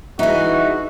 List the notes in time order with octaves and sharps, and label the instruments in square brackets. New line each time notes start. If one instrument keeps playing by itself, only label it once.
[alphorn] E3 [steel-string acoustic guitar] D#4 G#4 [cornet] F#4 [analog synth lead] E5